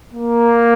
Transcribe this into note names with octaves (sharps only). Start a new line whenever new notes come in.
A#3